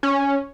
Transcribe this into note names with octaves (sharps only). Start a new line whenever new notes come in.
C#4